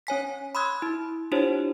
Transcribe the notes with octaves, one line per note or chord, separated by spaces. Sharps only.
C#4 C#5 G#5 B6
B5 C6 D#6 E6 F#6 G#6
E4
D4 E4 F4 G4 C5 C#5